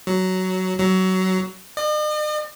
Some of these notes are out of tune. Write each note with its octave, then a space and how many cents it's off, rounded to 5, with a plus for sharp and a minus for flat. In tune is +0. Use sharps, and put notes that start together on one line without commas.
F#3 +10
F#3 +20
D#5 -45